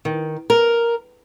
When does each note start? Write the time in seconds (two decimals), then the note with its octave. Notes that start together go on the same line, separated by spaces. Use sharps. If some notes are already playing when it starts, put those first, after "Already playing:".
0.05 D#3
0.50 A#4